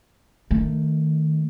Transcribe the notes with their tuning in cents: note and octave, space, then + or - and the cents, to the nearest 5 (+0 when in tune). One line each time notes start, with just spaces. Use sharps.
D#3 +0 A3 +15